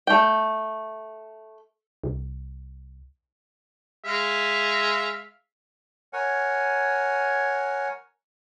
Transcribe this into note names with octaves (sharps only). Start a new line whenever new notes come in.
A3 G5
C2
G#3 E5 F5
A#4 C#5 F#5 G#5